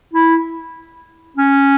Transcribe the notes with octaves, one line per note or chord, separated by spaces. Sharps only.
E4
C#4